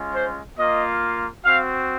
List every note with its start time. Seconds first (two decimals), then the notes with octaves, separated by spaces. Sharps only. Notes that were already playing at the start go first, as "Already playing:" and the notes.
Already playing: G#3 C#4 F4
0.14 C5
0.57 A#3 F4 D#5
1.44 C4 F#4 F5